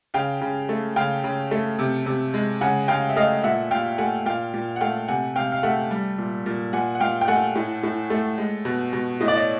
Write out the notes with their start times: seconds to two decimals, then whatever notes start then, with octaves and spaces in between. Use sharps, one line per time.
0.14 C#3 F5 G5
0.41 C#3
0.69 A3
0.96 C#3 F5 G5
1.24 C#3
1.51 A3
1.79 C3
2.06 C3
2.34 G#3
2.61 C#3 F#5 G#5
2.88 C#3 F5 G5
3.09 E5
3.16 A3 D#5 F5
3.43 A#2 E5 F#5
3.71 A#2 F5 G5
3.98 A3 F#5 G#5
4.26 A#2 F5 G5
4.54 A#2
4.76 F#5
4.81 A3 F5 G5
5.08 C3 F#5 G#5
5.36 C3 F5 G5
5.52 F5
5.63 A3 E5 F#5
5.91 G3
6.18 A#2
6.46 A#2
6.73 A#2 F#5 G#5
6.95 F#5
7.00 A#2 F5 G5
7.21 G5
7.28 A3 F#5 G#5
7.55 A2
7.83 A2
8.10 A3
8.38 G#3
8.65 B2
8.93 B2
9.20 A2 D#5
9.28 D5
9.35 C#5 D#5